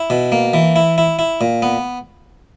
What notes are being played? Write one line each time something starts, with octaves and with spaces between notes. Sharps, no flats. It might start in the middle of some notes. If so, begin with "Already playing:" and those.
Already playing: E4
B2
A#3
E3
E4
E4
E4
A#2
B3